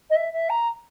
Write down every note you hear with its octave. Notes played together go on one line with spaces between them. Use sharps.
D#5
E5
E5
A#5